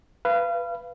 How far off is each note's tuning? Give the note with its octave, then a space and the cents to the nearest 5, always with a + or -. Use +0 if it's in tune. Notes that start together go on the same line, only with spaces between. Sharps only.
B4 +0 F5 -30